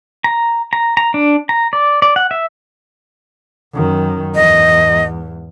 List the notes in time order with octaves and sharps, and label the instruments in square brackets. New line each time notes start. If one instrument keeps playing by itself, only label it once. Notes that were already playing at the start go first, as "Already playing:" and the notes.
[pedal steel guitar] A#5
A#5
A#5
D4
A#5
D5
D5
F#5
E5
[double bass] F#2 D#3
[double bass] E2 G#2 [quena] D#5